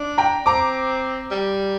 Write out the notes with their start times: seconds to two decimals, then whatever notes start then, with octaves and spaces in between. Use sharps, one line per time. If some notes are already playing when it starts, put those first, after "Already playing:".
Already playing: D4
0.18 G5 A#5
0.46 C4 A#5 D6
1.31 G3